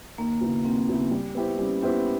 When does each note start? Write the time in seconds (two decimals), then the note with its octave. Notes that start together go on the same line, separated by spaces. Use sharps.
0.18 D#2 A#3
0.41 C#3 F#3 B3 E4
0.65 D#2 C4
0.88 C#3 F#3 B3 E4
1.11 G3
1.35 B3 E4 G4 C5
1.58 G3 C#4
1.82 B3 E4 G4 C5